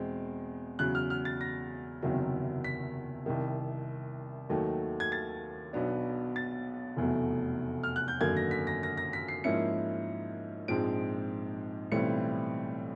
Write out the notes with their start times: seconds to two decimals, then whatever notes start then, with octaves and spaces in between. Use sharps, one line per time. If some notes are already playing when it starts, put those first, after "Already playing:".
Already playing: E2 B2 G#3 C4
0.79 E2 C#3 F#3 F#6
0.95 F6
1.10 F6
1.25 A6
1.41 A#6
2.02 F#1 E2 C3 D#3 F#3
2.64 B6
3.26 C2 C3 D#3
4.50 D#2 D#3 F#3 A3
5.00 G#6
5.12 A6
5.73 B1 B2 F#3 B3 D4
6.36 A6
6.97 F1 E2 B2 F#3 A3
7.83 F6
7.96 F#6
8.08 G6
8.21 G#1 F#2 D3 F#3 A#3 G#6
8.37 A#6
8.51 B6
8.67 A#6
8.83 A#6
8.97 A#6
9.13 B6
9.28 C7
9.44 G#2 F3 A#3 C#4 E4 C#7
10.68 A#1 G#2 F3 G#3 C4 D7
11.92 B1 A2 E3 G3 C4 C#7